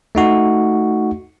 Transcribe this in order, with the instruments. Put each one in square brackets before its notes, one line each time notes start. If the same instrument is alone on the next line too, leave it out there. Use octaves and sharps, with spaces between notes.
[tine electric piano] A3 D#4 F#4